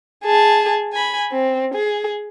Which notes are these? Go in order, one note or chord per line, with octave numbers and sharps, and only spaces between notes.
G#4 A5
G#5 B5
C4
G#4